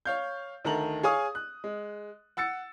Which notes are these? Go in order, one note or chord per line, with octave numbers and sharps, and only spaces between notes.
C#5 F5 G6
D2 D#3 A4 A#5 F#7
G#4 C#5 F5 G#5 C#6 D#6
F#6
G#3
F#5 E6 A6 C#7